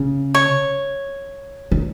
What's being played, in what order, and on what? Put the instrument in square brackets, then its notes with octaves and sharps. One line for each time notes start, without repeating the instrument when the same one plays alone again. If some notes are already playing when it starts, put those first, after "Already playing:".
Already playing: [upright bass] C#3
[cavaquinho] C#5
[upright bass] D#3